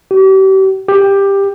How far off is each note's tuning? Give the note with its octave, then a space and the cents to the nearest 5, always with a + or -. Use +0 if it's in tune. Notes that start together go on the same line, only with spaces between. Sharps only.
G4 -35
G4 +15